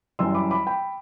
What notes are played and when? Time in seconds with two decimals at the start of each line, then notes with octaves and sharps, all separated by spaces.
0.19 F#2 E3 G3 C6 E6
0.35 B5 D6
0.51 B5 D6
0.67 G5 B5